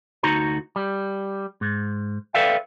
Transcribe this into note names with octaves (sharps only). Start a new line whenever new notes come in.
D2 D#4 F#4 A#5
G3
G#2
A4 B4 D5 E5 F5 G5